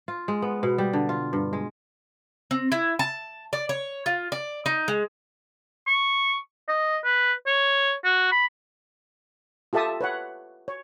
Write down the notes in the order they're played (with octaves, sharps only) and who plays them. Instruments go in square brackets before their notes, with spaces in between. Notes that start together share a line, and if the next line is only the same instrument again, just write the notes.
[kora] F4
G#3
B3
B2
G3
D3
F4
G2
G#3
[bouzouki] C4
E4
A5
D5
C#5
F4
D5
D#4
G#3
[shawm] C#6
D#5
B4
C#5
F#4
B5
[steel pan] F4 G4 A4 E5 A5 D#6
B4 C#5 F#5
C#5